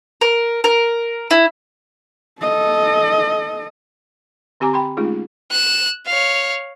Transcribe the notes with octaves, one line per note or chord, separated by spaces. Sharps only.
A#4
A#4
E4
A4 D#5
D3 C4 G4 G#5 A#5 D6
G5 B5 C6
G#3 A3 C#4 D#4 F4 G#4
F#6 E7
C#5 F5